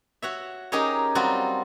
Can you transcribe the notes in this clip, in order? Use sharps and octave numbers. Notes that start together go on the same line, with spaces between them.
F#4 C#5 E5
C#4 D#4 G4 G#4 A#4 C#5
F#3 G3 C4 F4 F#4